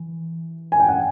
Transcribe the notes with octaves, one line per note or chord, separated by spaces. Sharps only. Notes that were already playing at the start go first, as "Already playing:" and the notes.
Already playing: E3
G#5
G5
F#5